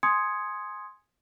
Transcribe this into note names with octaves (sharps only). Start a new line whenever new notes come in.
G#5 C6 D#6 G#6 C#7